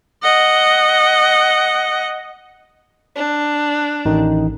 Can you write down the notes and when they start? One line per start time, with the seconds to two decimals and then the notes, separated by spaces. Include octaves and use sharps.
0.23 D#5 F#5
3.16 D4
4.05 A1 D#3 D#4